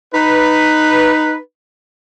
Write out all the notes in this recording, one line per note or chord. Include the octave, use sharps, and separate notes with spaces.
D#4 B4